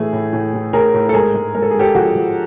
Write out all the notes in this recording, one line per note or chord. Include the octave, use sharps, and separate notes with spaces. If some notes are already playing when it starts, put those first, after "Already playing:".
Already playing: A2 E3 A3 G#4
A2
A2
A2
A2 G#4 A#4
A2
A4
G#2 G#4 A#4
G#3
G#3 A#4
A4
G#3 G#4
G4 A4
F3 F#4 G#4
F3